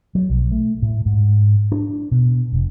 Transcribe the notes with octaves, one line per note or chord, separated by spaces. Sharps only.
F#3
B1
A3
A2
G#2
D4
B2
F1